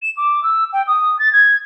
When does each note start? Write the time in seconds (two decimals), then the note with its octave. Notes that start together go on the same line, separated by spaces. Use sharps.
0.02 E7
0.17 D6
0.43 E6
0.73 G5
0.87 D#6
1.19 A6
1.33 G#6